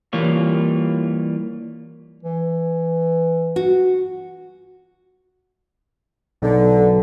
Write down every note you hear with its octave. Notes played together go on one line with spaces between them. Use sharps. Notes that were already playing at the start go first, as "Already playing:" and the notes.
E3 G3 A#3 F4 C#5
E3
F#4
B1 D3